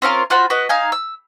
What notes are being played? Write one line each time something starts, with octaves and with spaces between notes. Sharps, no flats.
C4 C#4 F4 A#4
F4 F#4 C5 B5
F#4 B4 D#5
D#4 F5 G#5
E6